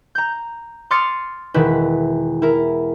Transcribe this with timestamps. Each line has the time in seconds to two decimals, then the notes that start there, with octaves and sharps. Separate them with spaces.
0.15 A#5 G6
0.91 C6 D6 D#6 F6 A6 C#7
1.54 E1 D#3 E4 B4
2.42 E4 A#4